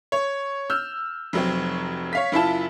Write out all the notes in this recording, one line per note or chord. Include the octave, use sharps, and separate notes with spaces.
C#5
E6 F6 G6
F1 F#3 C4
C#5 F5 B6
F#1 E4 F4 A5